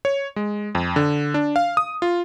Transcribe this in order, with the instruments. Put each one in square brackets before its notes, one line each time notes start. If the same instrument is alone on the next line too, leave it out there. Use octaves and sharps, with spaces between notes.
[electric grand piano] C#5
G#3
F2
D3
D4
F5
D#6
F4